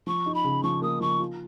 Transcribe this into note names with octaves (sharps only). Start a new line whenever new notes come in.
F3 C#6
D#4
B5
C#3
F3 C#6
A#3 D#6
F3 C#6
F4